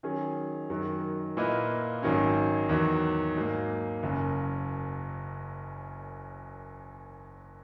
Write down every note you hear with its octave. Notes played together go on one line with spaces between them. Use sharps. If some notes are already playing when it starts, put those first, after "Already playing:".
D#3 F#3 C#4 G#4
F#2 D#3 F#3
A#2 A#3 E4 B4 D#5
G#1 G#2 D#3 F#3 C#4
E2 D#3 F#3
G#2 F#3 A#3
F#1 F#2 C#3